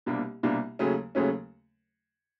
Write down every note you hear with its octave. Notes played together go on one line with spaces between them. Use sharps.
C2 B2 G3 A#3 D4
C2 B2 G3 A#3 D4
D#2 C#3 F#3 A3 C#4
D#2 C#3 F#3 A3 C#4